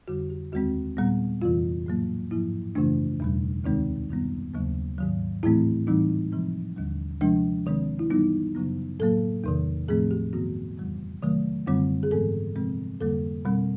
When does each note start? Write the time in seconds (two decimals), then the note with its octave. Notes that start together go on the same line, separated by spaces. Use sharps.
0.08 F2 D3 G3 F#4
0.30 G4
0.52 D#2 D#3 G#3 C4 F#4
0.97 A#2 G3 B3
1.42 F2 C3 E3 F4
1.86 A2 F#3 A#3
2.31 G#2 F3 A#3 E4
2.75 F#2 C#3 E3 A3 D4
3.20 E2 B2 G3
3.64 D2 C3 D#3 G#3 C4 D#4
4.09 F#2 D#3 G3 B3
4.54 D#2 C#3 F#3 A#3
4.98 G#2 D#3 F#3
5.43 A2 E3 A3 C4 E4
5.87 A2 E3 G3 C4 D#4
6.32 C3 F3 G#3 C4
6.76 D#2 D3 G3
7.21 C3 F3 G#3 D4
7.66 C3 D#3 G#3 C4
7.99 E4
8.10 G2 E3 G3 B3 D#4
8.55 F#2 C#3 F#3 B3
9.00 A2 F#3 A#3 A4
9.44 E2 C3 D#3
9.89 A2 F3 A3 C4 G#4
10.11 G4
10.33 G2 D#3 F#3 B3 F#4
10.78 F2 C#3 E3 G3
11.22 C3 D#3 F#3 A3
11.66 F#2 D3 G3 C4
12.03 G#4
12.11 G#2 E3 G#3 B3 A4
12.56 C3 F3 G#3 C4
13.00 F2 D3 G3 A#3 A4
13.45 B2 G3 C4